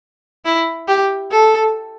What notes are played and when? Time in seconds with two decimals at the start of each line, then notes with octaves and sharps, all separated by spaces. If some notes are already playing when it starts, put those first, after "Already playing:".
0.45 E4
0.88 G4
1.31 A4